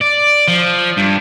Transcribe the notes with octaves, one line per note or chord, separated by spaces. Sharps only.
D5
F3
G2